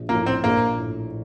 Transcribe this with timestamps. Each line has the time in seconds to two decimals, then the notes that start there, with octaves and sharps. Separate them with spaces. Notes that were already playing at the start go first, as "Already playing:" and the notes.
Already playing: A#1
0.09 A2 F3 A#3
0.26 C4
0.44 A#1 A#3
0.78 A2 A3